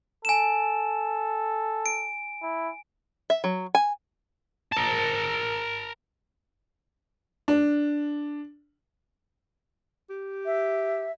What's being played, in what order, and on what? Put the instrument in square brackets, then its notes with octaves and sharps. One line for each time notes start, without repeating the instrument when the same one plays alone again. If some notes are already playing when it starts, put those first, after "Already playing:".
[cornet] A4 [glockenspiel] G#5 E7
[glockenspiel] D7
[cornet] E4
[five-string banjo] E5
F#3
G#5
[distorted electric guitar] A#4 A5
[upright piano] D4
[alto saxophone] G4
[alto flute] E5